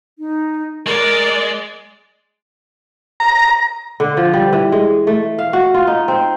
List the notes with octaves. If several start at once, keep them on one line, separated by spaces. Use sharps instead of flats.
D#4
G#3 A#4 D5
A#5
D3
F3
G3
E3
G#3
A3
F5
F#4
F4
D#4
C4